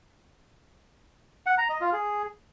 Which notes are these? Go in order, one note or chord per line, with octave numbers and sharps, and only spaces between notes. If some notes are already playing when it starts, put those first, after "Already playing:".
F#5
A#5
D#5
F4
G#4